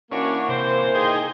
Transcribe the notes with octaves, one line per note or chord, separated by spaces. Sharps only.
E3 A#3 C#4 D4 F#4
C3 C5
D#4 G#4 G5